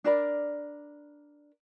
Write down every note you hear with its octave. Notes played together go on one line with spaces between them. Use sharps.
D4 A#4 D5 B5